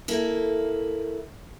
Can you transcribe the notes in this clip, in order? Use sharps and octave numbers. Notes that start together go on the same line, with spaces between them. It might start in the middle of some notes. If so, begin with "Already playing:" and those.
A#3 E4 A4